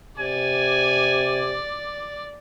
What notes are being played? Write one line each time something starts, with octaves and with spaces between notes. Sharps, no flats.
C3 D5 G#5